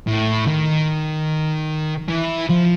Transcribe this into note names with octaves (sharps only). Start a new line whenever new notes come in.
A2
D#3
E3
F3